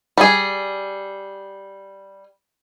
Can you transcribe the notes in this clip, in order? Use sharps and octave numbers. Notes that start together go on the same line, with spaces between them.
G3 G#4